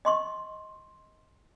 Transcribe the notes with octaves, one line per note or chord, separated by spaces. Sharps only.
D#5 C6 C#6